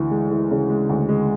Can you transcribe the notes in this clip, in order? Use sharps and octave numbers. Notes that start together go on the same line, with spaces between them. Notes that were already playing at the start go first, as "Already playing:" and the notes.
Already playing: D2 E3
G#3
E3
C#3
G#3
D2
G#3